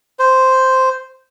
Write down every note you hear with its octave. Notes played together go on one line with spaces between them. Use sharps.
C5